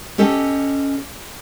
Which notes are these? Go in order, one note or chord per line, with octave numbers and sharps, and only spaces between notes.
C#4 G4 A4 D#5